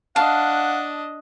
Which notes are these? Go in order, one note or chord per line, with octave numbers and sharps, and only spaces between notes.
D4 D#5 F5 F#5 A5